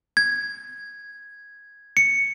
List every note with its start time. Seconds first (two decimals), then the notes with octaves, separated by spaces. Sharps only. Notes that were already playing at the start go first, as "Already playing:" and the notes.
0.17 G#6
1.97 C#7